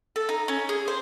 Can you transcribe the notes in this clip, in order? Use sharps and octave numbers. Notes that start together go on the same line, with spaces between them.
A4
D#4
C#4
G#4
C5